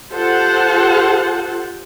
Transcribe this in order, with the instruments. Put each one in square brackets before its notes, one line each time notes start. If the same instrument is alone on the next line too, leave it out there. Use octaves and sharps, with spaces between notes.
[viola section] F4 G4 A4 C5 F#5 A5